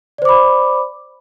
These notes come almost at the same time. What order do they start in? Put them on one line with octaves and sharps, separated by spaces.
D5 C5 D6 B5